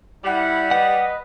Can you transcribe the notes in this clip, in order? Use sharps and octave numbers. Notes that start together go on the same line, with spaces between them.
G3 E4 F#5
B4 D#5 F#5